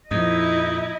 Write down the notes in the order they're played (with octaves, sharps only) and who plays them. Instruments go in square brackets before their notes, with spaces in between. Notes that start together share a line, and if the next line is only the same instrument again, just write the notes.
[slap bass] F2 [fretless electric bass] A#2 F3 [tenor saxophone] D#4 [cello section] E4 D#5